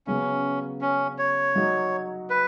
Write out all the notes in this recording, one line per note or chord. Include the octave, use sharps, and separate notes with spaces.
C#3 F#3 B3 C#4
C#4
C#5
F#3 D#4 F#4
B4